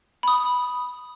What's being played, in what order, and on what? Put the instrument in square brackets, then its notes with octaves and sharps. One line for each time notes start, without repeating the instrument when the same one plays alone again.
[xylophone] B5 D#6